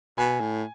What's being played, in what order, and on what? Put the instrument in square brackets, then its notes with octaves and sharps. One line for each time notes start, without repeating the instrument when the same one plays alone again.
[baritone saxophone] B2 [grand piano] G#5
[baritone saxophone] A2